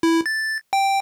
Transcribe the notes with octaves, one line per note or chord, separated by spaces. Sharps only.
E4
A6
G5